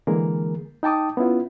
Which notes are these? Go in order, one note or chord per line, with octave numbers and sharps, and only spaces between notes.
D3 E3 G#3 A#3 G#4 A#4
D#4 G5 A5 D6 D#6
B3 C#4 E4 F4